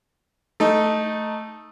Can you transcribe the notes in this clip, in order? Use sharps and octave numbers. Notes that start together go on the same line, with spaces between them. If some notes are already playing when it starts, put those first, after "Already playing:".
A3 D#4